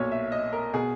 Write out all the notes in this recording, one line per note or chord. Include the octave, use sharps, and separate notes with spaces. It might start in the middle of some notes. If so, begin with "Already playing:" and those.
Already playing: B1 A#2 C#5
E5
D#5
A#4
B2 G#4